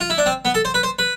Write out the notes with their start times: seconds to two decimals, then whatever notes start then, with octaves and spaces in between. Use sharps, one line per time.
0.01 F4
0.10 E4
0.18 D4
0.26 C4
0.45 B3
0.54 A4
0.65 C5
0.74 B4
0.83 C5
0.99 B4